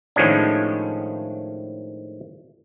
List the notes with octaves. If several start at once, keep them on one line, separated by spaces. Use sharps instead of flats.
A2 D#3 F3 G#3 C#4 D4